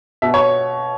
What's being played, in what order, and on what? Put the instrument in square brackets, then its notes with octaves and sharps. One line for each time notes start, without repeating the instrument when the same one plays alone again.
[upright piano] B2 E5
C#5